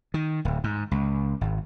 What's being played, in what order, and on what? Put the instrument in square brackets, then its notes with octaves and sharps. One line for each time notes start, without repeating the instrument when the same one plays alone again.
[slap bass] D#3
D1
G#2
C#2
G#1